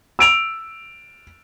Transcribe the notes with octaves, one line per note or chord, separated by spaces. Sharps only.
E6 D7 F7